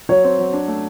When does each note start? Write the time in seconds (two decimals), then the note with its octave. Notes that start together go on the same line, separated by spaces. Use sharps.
0.09 F#3 C#5
0.24 C4
0.39 F#3
0.53 D4
0.68 A3